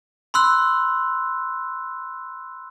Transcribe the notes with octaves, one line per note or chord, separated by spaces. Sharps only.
B5 C6 E6 F#6